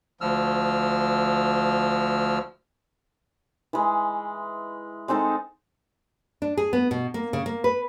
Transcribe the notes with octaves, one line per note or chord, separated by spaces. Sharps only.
D2 F3 E6 F6
E3 G#3
G#3 C4 D#4 A4
D4
G#4
B3
B2
A#3
C#3
A#3
B4